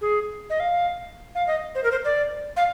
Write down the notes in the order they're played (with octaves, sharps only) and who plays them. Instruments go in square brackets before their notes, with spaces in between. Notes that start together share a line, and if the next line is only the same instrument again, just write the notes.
[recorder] G#4
D#5
F5
F5
D#5
C5
A#4
C5
D5
F5